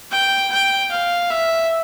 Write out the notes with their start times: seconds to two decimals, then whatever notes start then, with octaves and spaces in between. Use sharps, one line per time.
0.12 G5
0.51 G5
0.91 F5
1.30 E5